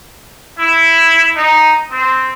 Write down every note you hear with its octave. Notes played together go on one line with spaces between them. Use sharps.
E4
D#4
C4